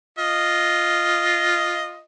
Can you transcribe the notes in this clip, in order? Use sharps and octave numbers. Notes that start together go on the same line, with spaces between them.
F4 D#5